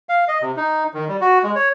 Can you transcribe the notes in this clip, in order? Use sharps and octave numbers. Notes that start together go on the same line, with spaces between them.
F5
D#5
C3
D#4
D#3
G3
F#4
G#3
C#5